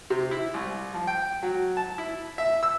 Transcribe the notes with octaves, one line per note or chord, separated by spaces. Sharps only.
C3
E4
C2
F3
G5
F#3
A5
E4
E5
E6